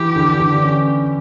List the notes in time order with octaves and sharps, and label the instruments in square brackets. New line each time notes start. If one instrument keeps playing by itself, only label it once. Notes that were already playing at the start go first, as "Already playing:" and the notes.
Already playing: [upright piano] E3 [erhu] G4
[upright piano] D3
D3
C#4